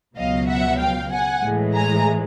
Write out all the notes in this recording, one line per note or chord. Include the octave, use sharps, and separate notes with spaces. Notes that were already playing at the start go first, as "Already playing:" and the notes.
C#2 B2 F#3 D#5 F5
E5 F#5
F5 G5
F#5 G#5
A2 E3 G#3
G#5 A#5